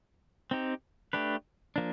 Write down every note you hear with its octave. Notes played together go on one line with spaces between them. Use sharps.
C4 D#4 G4
A3 D4 G4 B4
F3 A#3 D4